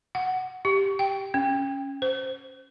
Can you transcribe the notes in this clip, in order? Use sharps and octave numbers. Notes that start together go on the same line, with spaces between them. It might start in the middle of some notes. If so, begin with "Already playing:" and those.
F#5
G4
G5
C#4
C5